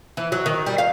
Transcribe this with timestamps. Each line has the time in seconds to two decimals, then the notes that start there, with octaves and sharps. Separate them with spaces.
0.17 E3
0.32 F#3
0.46 D#3
0.66 G3
0.78 F5